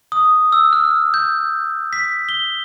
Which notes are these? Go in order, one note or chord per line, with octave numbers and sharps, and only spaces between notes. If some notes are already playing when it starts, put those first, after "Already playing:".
D#6
E6
F6
G6
B6
G7